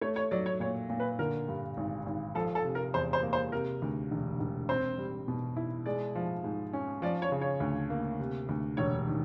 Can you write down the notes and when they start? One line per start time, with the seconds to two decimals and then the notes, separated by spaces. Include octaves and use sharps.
0.01 A3 C#5
0.16 C#5
0.31 F#3 D5
0.46 C#5
0.60 A#2 C#5
0.90 A#2
1.00 B4
1.19 D3 A#4
1.48 G2
1.77 G#1
2.07 G#1
2.35 F3 A4
2.55 A4
2.65 C3
2.75 A#4
2.94 E2 C5
3.13 C5
3.23 A#3
3.33 C5
3.52 C3 A#4
3.82 D2
4.11 E1
4.40 E1
4.69 C4 C5
4.98 G3
5.28 B2
5.56 E4
5.86 G#3 D5
6.15 F3
6.44 G#2
6.73 C#4
7.02 F3 D5
7.22 C#5
7.32 C#3
7.42 C#5
7.60 D2
7.90 A#3
8.20 C3
8.49 D2
8.77 E1 C#5
9.07 D#3